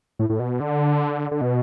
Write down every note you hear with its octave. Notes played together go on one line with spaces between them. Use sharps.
A2
A2
B2
D3
D3
B2